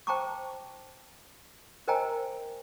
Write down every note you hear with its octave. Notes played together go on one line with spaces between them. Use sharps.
C5 G5 A5 A#5 C#6 D6
A#4 C5 D#5 G5 G#5 A#5